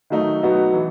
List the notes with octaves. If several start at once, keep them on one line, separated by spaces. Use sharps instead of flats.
D#3 F#3 A3 D#4
B2 F#3 B3 D#4 F#4
E3